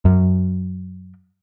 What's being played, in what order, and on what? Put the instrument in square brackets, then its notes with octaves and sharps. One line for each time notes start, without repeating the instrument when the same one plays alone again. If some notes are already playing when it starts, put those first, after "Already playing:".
[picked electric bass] F#2